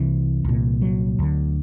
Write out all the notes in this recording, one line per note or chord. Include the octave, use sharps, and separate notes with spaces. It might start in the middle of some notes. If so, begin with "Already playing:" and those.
Already playing: C2 C3 E3
C2 A#2
F#3
D2 D3